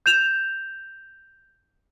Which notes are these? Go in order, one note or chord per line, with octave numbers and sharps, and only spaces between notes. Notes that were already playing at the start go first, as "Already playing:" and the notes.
G6 E7 F7